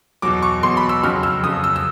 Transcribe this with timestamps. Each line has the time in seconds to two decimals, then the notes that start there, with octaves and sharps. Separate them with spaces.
0.22 E2 B2 F#3 D6
0.42 C#6
0.63 E2 B2 F#3 C6
0.77 B5
0.89 E6
1.03 F2 C#3 F#3 F6
1.23 E6
1.43 F2 C#3 F#3 D#6
1.64 E6
1.76 E6